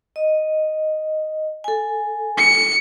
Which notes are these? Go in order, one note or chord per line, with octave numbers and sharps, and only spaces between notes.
D#5
A4 G#5
C#7